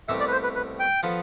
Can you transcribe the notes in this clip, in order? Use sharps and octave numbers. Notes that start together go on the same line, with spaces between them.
C2 B2 A3 C4 G4 E5
D5
B4
C5
B4
B4
G5
F3 B3 F4 A4